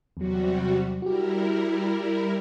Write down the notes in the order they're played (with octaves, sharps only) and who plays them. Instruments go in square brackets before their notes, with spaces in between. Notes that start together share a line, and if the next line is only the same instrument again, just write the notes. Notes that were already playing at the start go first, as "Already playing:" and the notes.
[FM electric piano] E2 F#3 [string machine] C3 G3 F#4
[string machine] G3 E4 A#4 [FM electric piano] F#4 G4